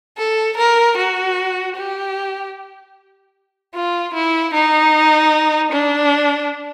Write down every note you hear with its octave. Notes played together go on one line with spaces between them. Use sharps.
A4
A#4
F#4
G4
F4
E4
D#4
D4